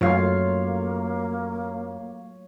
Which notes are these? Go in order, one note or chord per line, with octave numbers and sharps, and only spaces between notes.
F#2 F#3 A3 A#3 F4 C#5 F5